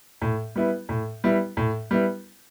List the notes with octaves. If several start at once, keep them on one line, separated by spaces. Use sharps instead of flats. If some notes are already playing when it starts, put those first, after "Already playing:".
A2
G3 B3 E4
A2
G3 B3 E4
A2
G3 B3 E4